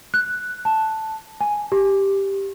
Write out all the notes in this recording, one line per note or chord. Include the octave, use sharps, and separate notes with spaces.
F#6
A5
G#5
G4